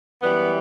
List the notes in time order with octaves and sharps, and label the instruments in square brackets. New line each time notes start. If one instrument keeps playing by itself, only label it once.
[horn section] F#2 E3 G3 B3